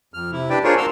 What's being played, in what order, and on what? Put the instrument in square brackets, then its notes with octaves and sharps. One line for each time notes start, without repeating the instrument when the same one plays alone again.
[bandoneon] F2 F6
C3 E4
D4 G4 B4 D5 G5
D4 F4 G#4 A#4 C5 C#5
F#4 A#4 F5 A#5 C6 E6